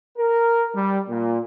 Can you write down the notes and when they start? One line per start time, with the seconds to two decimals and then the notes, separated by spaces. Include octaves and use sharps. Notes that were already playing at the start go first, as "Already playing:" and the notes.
0.18 A#4
0.75 G3
1.09 A#2